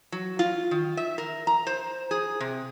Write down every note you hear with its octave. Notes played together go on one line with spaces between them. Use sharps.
F#3
F4
D#3
E5
A#4
A#5
C5
G#4
C3